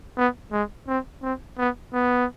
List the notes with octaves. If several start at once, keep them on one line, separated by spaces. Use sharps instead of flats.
B3
G#3
C4
C4
B3
B3